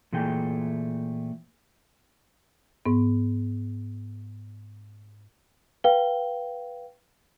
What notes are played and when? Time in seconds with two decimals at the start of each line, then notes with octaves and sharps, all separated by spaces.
0.13 A#2 E3 A3 G#4 G5
2.86 G#2 B3
5.84 B4 F5 G5 G7